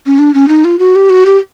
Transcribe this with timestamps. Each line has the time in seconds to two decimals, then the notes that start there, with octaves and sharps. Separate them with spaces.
0.06 C#4
0.19 D4
0.34 C#4
0.48 D#4
0.64 F4
0.79 F#4
0.96 G4
1.10 F#4
1.26 G4